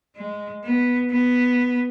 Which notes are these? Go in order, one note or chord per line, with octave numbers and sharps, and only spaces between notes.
G#3
B3
B3